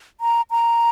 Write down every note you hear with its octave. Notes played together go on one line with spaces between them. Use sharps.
A#5
A#5